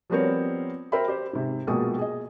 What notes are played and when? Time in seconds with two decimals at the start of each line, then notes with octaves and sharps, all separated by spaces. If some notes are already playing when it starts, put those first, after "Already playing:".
0.10 F3 G3 B3 C4 A#4 C#5
0.92 A#4 C5 E5 G5 B5
1.08 G4 C5
1.33 G#2 C3
1.67 A#1 B2 G#3 A#3 F#4 D#6
1.98 G#4 D#5